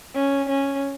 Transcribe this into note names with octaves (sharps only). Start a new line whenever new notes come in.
C#4
C#4